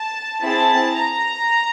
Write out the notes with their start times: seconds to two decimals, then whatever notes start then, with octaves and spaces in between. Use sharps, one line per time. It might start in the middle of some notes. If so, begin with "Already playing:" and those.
Already playing: A5
0.42 C4 E4 G#4 A5
0.95 A#5